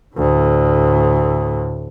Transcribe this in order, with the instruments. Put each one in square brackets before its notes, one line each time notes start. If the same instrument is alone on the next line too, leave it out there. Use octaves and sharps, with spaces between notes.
[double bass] D2 A2